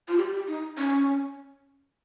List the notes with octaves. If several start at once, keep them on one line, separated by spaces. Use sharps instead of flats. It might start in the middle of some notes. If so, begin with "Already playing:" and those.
F4
G4
G4
D#4
C#4